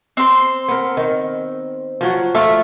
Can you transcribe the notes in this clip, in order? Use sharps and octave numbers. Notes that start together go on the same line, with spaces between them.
C4 C6
B3 A#4
D#3
F3 F#3 F#4
A3 F4 E5